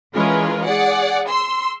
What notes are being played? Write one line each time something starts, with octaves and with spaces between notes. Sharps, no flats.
E3 G#3 C#4 F4 A#4 B4
G#4 D5 F#5
C6 E6